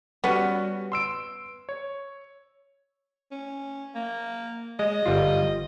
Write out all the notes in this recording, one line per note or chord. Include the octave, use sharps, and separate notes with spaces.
G3 B3 C#4 F#4
C6 E6 D7
C#5
C#4
A#3
G#3 D#5
G1 G3 F4